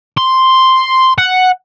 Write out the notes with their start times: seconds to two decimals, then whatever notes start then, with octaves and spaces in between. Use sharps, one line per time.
0.17 C6
1.18 F#5